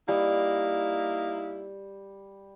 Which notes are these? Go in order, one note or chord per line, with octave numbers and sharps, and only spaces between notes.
G3 A#3 D#4 E4